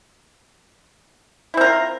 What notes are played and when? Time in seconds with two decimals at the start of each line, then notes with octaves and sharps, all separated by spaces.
1.54 E4
1.57 C4
1.61 A#4
1.64 F4